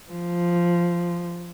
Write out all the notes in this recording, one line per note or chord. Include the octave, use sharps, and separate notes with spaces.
F3